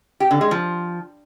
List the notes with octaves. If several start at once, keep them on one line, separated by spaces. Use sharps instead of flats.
G4
D3
G#3
F3